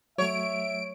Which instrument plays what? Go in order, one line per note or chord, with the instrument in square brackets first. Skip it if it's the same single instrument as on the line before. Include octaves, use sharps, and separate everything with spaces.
[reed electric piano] F#3 A3 [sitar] C#5 [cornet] E5 [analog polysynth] D7